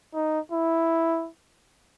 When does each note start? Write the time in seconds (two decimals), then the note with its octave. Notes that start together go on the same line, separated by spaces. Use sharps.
0.14 D#4
0.52 E4